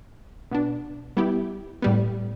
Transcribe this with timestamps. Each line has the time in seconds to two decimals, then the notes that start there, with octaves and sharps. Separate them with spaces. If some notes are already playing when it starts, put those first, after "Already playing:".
0.51 B2 B3 D4
1.17 G3 B3 E4 G4
1.82 A2 G3 B3